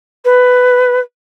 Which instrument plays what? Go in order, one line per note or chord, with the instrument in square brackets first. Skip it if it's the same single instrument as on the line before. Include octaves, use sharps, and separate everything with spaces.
[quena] B4